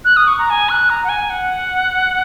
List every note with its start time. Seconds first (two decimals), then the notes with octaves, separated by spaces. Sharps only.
0.05 F#6
0.16 D#6
0.27 C#6
0.38 A#5
0.50 G#5
0.69 F#6
0.90 A#5
1.04 F#5
1.09 G#5
1.30 F#5